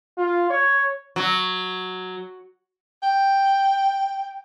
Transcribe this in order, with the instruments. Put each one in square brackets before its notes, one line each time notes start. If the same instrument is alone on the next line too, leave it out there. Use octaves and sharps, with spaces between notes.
[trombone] F4
C#5
[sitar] F#3
[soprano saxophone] G5